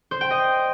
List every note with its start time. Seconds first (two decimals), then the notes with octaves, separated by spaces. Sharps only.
0.11 C5
0.21 G5
0.31 D#5